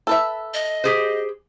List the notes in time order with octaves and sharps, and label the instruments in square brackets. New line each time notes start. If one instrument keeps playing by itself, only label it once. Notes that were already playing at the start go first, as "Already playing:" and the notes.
[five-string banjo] A4 B4 E5
[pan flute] D#5
[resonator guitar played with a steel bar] G4 G#4 C5